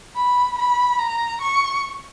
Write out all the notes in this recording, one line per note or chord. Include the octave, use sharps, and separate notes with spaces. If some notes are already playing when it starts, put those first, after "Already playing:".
B5
B5
A#5
C#6